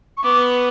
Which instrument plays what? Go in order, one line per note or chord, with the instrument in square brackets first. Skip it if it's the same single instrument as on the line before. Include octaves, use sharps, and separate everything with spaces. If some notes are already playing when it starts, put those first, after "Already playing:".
[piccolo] C#6
[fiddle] B3 [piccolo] D6